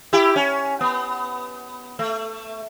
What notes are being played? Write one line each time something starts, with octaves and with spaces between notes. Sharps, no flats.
E4 G4
C#4
B3
A3